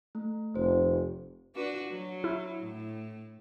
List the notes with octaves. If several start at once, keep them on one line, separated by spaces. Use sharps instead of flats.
A3
F1 C5
D4 F#4 B4
F#3
E4
A2